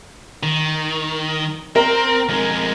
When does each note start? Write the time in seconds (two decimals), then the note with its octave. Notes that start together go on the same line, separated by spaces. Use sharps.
0.43 D#3
1.76 C4 A#4
2.29 F2 G#3